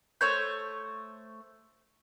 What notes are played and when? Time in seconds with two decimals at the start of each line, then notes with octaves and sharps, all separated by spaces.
0.21 A3 C5 C#5 G6